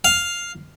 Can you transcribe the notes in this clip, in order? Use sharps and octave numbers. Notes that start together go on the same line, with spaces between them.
F5